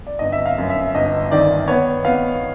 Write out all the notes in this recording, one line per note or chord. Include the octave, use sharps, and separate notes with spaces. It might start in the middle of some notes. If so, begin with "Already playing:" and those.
D5
G1 D#5
E5
F5
F#2
E5
G1 D#5
D#3 D5
B3 C#5
B3 F5